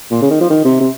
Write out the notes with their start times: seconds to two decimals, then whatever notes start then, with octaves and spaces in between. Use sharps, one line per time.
0.11 A#2
0.22 C#3
0.30 D#3
0.41 F3
0.50 D#3
0.65 C3
0.80 C3